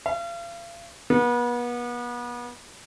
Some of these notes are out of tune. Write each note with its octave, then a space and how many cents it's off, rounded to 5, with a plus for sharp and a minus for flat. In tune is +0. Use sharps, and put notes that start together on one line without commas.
F5 -40
B3 -35